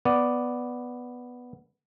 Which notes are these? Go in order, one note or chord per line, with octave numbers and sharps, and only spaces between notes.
B3 D5